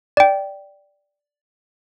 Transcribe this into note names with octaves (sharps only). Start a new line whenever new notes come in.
D5 G5